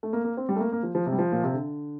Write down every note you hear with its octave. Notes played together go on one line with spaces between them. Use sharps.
A3
A#3
A#3
C4
G3
A3
A#3
A#3
F3
F3
C3
G3
F3
A#2
C3
D3